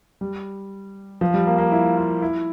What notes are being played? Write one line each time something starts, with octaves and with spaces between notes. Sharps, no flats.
G3
F3
G3
A#3
A#3
E4
F4
E4